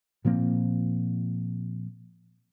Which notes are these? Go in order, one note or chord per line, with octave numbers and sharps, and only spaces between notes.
A#2 F3 A#3 C4